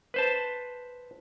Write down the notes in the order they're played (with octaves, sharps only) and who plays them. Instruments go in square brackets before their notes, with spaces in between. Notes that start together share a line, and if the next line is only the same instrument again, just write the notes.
[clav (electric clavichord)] B4 C5 A5